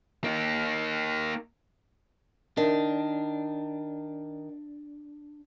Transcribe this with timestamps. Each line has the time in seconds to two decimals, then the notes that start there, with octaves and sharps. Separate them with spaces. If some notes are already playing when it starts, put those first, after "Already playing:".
0.24 A#3 D#4
2.57 D#3 D4